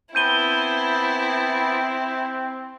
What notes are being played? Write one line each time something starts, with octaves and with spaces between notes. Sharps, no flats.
B3 C4 E4 G#5 A5 G6 D#7 G7